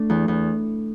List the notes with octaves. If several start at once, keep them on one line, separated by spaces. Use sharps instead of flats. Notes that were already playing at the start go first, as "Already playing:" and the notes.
Already playing: A3 D4
E2
E2